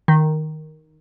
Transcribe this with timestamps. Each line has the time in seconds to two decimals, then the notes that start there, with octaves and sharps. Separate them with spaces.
0.08 D#3